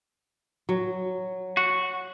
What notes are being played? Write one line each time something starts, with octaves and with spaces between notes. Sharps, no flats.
F#3
F#4